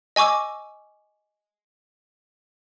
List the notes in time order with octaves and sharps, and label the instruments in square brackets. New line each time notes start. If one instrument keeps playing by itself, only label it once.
[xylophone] D#5 G#5 C#6 D6 E6